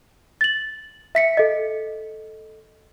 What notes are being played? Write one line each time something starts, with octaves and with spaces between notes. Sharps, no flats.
A6 F#7
E5 B6 C#7
A4 D#5